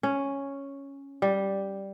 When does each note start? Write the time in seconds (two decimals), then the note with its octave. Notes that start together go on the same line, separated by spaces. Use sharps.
0.03 C#4
1.22 G3